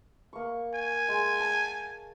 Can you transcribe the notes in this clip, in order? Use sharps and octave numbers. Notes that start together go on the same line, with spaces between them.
A#3 C#6
G#5
G#3
A5